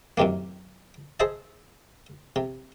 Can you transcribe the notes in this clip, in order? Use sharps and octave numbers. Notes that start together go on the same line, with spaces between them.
F#2 A2 C3 D#3 A#3
G#4 C5 D#5 E5 A5
C3